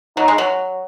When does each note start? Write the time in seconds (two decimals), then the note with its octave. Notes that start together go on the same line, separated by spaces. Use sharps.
0.17 F#3 D#4
0.28 G#3
0.38 F#3